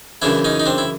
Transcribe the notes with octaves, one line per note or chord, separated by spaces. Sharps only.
F#2 C#3 E3 D4 E4
C#4 D#4
D#4
C4 D4
E4